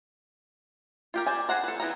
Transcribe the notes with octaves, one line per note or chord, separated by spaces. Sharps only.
F4 G4 A#4
C5 D5 G#5
G#4 C5 F#5 A#5
A4 B4
E3 B3 E4 B4 A#5